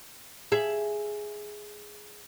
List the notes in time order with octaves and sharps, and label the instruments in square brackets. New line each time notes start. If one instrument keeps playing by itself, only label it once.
[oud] G#4 E5